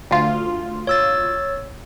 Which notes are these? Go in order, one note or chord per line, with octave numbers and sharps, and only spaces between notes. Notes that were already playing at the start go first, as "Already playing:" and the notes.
D2 F4
C#5 E6 A6